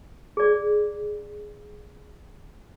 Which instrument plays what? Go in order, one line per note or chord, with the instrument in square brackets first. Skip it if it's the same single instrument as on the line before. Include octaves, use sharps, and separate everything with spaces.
[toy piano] G#4 D5